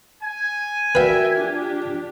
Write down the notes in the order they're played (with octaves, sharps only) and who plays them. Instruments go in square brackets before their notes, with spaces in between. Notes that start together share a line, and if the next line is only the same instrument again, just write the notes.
[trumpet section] G#5
[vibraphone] F#4 A#4 D5 [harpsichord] B4 F5 [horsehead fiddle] E5 G5
[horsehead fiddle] D4 G4 [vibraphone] F4